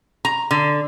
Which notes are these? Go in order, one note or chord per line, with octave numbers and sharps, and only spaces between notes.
A#5
D3